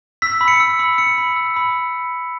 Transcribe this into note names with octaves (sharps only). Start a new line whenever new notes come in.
E6 B6
B5
C#7
E6
B5
E6 C#7
B5
E6
B5